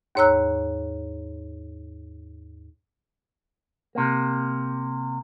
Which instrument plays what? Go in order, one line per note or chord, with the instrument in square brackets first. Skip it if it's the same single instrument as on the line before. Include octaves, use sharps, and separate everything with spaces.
[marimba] D#2 G#2 C#5 A#5 E6 F#6
[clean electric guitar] C3 A#3